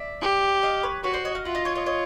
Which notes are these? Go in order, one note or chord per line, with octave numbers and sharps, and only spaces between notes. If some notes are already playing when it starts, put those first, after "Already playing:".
Already playing: D5 E5
G4
D#5 F5
B4 C#5
F#4 B4 C#5
C5 D5
C#5 D#5
D#5 F5
F4 E5 F#5
D#5 F5
C#5 D#5
C#5 D#5
C#5 D#5